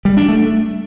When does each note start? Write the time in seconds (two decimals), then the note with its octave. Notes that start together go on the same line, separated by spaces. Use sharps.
0.05 G3
0.17 D4
0.29 A3